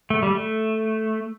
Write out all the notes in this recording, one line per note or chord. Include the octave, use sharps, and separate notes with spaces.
A3
G3
A3